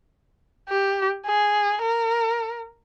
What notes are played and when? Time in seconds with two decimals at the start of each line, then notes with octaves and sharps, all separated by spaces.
0.69 G4
1.26 G#4
1.82 A#4